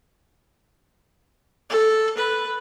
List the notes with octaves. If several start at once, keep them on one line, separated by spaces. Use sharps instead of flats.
A4
B4